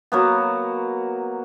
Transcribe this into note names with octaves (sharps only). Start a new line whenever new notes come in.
F#3 A#3 B3